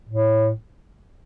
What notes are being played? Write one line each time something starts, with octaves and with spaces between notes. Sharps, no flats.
A2